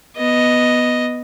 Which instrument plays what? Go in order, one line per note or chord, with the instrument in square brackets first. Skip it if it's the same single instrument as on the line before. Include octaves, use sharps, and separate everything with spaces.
[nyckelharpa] B3 D#5